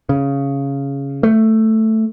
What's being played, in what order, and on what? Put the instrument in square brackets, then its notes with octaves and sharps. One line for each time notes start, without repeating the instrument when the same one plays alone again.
[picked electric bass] C#3
A3